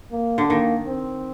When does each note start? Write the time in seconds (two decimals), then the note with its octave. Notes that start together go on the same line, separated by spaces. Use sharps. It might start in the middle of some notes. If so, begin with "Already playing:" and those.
0.12 A#3
0.38 D3
0.49 D#3 A#3
0.87 C4